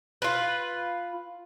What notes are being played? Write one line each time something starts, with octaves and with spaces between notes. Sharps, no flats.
F4 B4